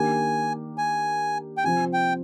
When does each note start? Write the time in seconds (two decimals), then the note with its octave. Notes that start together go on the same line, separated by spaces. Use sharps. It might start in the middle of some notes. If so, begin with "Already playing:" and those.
Already playing: D#3 A#3 D4 G4 A#4 G#5
0.78 G#5
1.57 G5
1.64 C3 F3 C4 G#5
1.93 G5